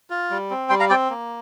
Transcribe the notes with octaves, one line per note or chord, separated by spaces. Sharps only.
F4
G3
C4
G3 G5 C6
F5 A#5
C4 D5 G5
A#3